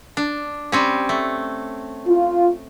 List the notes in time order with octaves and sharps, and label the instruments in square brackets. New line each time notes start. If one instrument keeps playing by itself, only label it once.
[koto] D4
G3 C4 C#4
A3
[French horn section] F4